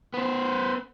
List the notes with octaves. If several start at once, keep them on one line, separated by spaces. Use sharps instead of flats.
B3 C5